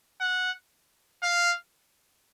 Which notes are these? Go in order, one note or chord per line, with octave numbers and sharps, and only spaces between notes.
F#5
F5